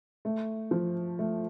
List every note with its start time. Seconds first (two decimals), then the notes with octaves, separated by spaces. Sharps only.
0.25 A3
0.71 F3
1.19 A3